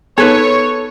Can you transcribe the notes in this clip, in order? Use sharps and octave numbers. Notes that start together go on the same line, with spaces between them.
B3 D#4 A4 B4 C#5